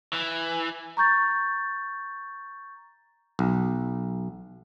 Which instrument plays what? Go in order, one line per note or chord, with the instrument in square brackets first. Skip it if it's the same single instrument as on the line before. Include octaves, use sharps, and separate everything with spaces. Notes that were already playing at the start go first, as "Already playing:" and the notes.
[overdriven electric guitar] E3
[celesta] A#5 C#6 G6 A6
[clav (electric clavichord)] B1